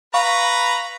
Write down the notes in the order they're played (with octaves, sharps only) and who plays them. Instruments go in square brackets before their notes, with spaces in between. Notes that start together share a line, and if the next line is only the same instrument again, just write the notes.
[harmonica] B4 A#5 B5 [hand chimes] F5 C#6